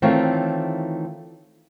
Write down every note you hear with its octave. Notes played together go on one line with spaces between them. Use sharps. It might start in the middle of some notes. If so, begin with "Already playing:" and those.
D#3 E3 A3 C4 F4 C#5